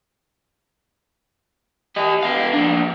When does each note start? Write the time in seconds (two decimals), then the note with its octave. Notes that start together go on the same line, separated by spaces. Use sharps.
1.96 G4 D#5
2.23 B3 F5
2.54 A#3 D4